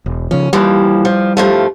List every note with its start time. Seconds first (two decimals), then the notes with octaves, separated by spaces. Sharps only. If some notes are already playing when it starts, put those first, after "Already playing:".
0.06 E1
0.31 C#3 F3 C#4
0.53 D#2 E3 F3 G3
1.05 F3
1.37 G2 F3 A3